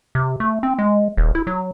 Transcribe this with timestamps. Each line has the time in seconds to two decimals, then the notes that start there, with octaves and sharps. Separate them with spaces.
0.15 C3
0.40 A3
0.63 C4
0.79 G#3
1.17 D#1
1.35 E4
1.47 F#3